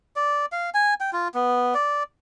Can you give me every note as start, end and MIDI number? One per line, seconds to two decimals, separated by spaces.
0.16 0.46 74
0.52 0.70 77
0.74 0.94 80
1.00 1.11 79
1.13 1.28 65
1.34 1.74 59
1.74 2.03 74